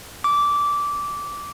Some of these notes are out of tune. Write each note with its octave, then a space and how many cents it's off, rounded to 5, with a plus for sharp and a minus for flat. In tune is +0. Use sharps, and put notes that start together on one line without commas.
D6 -15